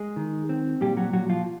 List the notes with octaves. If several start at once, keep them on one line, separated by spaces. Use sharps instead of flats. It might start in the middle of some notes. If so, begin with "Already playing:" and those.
Already playing: G#3 G#4
D#3
C4
A#2 G3 G4
F#3 F#4
A#2 F#3 F#4
F3 F4